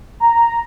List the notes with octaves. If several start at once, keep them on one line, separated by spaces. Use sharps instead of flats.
A#5